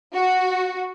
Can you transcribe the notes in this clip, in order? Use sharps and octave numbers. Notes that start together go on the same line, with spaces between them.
F#4